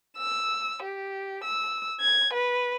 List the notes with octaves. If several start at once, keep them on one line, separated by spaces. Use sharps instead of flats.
E6
G4
E6
G#6
B4